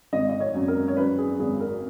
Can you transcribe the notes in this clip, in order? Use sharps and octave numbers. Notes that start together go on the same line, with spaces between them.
G#1 D#5
D#5
C#5
F#2
A#4
C#5
F#2 B4
G#4
G#1 G#4
A#4